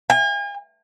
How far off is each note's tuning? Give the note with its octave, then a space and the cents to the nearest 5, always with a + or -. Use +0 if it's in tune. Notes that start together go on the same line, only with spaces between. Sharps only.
G#5 -40